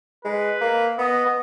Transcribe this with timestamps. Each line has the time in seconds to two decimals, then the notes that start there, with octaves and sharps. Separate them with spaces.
0.25 G#3 B4
0.61 A#3
0.98 B3 D#5
1.26 B3